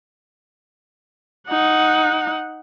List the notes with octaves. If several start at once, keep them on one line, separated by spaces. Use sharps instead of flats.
D#4 F#5